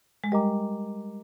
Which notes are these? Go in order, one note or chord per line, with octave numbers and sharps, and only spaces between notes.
G#3
G3 G4 A#4 D#5 A#5 D6